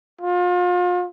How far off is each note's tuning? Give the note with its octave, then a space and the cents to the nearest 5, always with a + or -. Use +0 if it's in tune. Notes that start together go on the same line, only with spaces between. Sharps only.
F4 +35